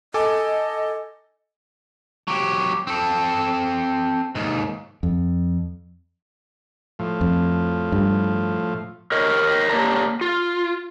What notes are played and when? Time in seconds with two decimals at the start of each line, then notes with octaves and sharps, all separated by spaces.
0.14 A4 D#5 G#5 D6
2.28 F#3 G4
2.87 C4 A4
4.35 D#2 G#2
5.03 F2
6.99 A2 F3
7.21 F2
7.92 G2
9.12 A#4 C#5 D#5
9.70 A#3 G4 C#5 D5 A5 A#5
10.21 F4